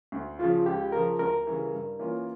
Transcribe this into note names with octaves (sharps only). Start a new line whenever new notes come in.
D2
C#3 F3 F4
C#2 G4
C#3 F3 A#4
D2 A#4
C#3 E3 G3
G2
E3 A#3 C#4 F4